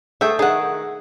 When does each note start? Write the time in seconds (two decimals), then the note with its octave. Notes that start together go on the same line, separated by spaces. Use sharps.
0.21 A3 G#4 E5 G5
0.39 D#3 G#4 F#5